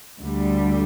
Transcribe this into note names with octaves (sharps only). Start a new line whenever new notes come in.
D2 D3 G3